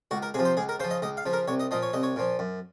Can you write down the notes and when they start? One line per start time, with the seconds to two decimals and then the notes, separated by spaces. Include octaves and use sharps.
0.11 C#2 F#4
0.22 A#4
0.34 C3 F3 G#4
0.45 C5
0.57 C#2 G#4
0.69 A#4
0.80 C#3 C5
0.84 F3
0.91 D#5
1.02 C#2 D#5
1.17 F5
1.26 C#3 F3
1.33 A#4
1.48 C2 C#5
1.60 D#5
1.71 A#2 F3 D#5
1.82 C#5
1.93 C2 D#5
2.03 C#5
2.16 A#2 F3
2.39 F#2